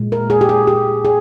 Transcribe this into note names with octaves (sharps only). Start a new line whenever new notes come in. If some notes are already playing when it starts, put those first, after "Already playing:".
Already playing: A#2 G#3
A#4
G#4
G4
G#4
G4
G#4